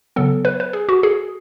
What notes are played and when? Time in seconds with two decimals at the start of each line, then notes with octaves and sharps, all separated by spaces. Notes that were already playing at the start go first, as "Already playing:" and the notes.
0.16 C#3 F#3 B3 A4
0.45 B4
0.60 B4
0.73 G#4
0.89 F#4
1.03 G#4